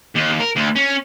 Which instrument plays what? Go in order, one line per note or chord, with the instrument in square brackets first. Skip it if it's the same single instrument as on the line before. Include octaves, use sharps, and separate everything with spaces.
[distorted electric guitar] D#2
A#4
D2
C#4